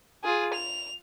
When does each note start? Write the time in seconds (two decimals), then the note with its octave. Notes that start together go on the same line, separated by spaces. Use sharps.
0.24 F4 G#4
0.54 F7